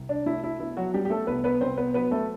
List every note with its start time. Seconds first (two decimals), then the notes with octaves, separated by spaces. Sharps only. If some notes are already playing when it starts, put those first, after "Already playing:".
Already playing: C2
0.09 D4
0.26 A3 E4
0.44 E4
0.60 B3 E4
0.77 F#3 F#4
0.94 G3 B3 G4
1.05 G4
1.10 A3 A4
1.27 C2 B3 B4
1.44 B3 B4
1.61 C2 C4 C5
1.77 B3 B4
1.94 F#3 B3 B4
2.11 A3 A4